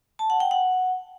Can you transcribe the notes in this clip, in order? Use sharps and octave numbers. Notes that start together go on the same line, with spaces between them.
A5
F#5
G5
F#5